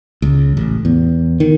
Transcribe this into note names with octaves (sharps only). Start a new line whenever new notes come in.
C#2
A1
E2
D#3